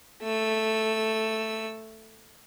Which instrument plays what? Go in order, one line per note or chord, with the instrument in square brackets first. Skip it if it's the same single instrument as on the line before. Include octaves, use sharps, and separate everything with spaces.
[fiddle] A3 E6